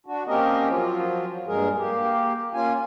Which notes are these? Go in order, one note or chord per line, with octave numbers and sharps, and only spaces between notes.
D4 F#4
A#3 C4 C#4 G4 A#4 D#5
F3 F#3 F4
G2 A#2 G#3 G#4 A#4
A#3 G4
A#3 C#4 F4 G#5